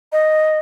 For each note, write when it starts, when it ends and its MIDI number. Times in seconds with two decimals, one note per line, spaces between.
0.12 0.59 75